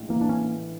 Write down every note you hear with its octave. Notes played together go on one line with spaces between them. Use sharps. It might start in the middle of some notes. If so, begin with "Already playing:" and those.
Already playing: A#1 A2 G#3
E3 A#3
D4
C#4